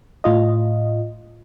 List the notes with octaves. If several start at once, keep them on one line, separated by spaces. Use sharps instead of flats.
A2 F4 D#5